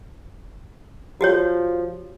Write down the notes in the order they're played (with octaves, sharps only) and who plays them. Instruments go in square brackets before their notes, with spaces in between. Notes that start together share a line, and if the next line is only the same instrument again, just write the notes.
[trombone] F3 [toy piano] F#4 G4 C#5